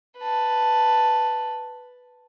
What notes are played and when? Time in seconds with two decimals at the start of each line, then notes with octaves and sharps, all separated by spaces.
0.18 B4 A5